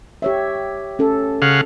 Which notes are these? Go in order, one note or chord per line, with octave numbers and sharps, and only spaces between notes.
G4 C#5 E5
C#4 A4
C#3 F5 F#5